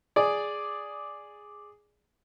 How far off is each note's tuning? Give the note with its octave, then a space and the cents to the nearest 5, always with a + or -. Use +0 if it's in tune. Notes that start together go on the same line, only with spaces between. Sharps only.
G#4 +0 D5 +0